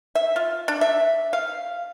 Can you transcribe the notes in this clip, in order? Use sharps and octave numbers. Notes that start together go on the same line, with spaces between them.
E5
F4
D4
E5
F5